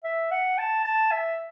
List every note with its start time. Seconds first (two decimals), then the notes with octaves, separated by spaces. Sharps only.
0.04 E5
0.31 F#5
0.58 A5
0.85 A5
1.11 E5